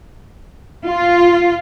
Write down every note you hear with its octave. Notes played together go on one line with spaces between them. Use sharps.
F4